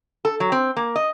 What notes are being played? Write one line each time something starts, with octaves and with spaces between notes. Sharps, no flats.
A4
F#3
C4
A#3
D#5